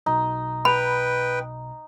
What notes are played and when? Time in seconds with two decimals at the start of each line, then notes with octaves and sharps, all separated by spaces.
0.06 B1 B2 D#4
0.65 B4 G5 B5